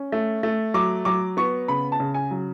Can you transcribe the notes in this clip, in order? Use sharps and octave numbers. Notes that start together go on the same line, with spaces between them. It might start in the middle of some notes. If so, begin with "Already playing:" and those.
Already playing: C#4
A3
A3
F#3 D6
F#3 D6
B3 C#6
C#3 B5
A5
C#3
G#5
F#3